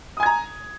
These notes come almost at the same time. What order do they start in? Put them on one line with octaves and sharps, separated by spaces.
D#6 G#5 G#6 A#5